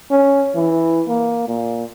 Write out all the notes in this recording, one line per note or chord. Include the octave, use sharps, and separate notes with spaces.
C#4
E3
A#3
A#2